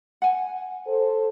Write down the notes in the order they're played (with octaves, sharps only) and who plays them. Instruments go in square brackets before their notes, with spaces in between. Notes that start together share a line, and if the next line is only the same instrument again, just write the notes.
[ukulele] F#5 G#5
[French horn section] A4 C5